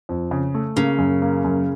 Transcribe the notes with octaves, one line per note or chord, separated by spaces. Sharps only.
F2
C#3
A3
C#3 A#3
F#2
A#3
F#2